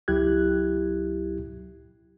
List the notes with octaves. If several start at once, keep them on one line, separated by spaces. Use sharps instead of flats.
C#2 F#3 E4 G4 F#6 G#6